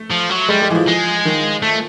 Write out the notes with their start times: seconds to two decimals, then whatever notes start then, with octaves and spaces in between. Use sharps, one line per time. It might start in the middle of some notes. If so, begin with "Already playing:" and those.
Already playing: A3
0.11 F3
0.31 F#3
0.49 G3 G#3
0.62 G#3
0.70 E3
0.75 F3
0.87 G#3
1.25 D#3
1.62 A3